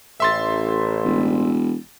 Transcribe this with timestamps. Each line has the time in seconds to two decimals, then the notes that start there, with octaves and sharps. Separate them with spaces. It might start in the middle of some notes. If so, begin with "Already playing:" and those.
0.20 A1 E5 C6 A6
1.04 E1